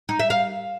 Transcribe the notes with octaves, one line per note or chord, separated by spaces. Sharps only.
D#4
E5
F5